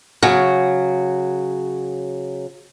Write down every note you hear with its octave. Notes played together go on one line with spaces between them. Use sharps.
C#3 F#3